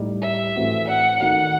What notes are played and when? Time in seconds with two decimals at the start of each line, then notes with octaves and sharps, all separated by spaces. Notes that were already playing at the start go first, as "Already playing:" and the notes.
Already playing: A2 G3 D#4
0.22 E5
0.56 A2 E3 A3 C4 F#4
0.88 F#5
1.20 D#3 A3 D#4 F#4 F#5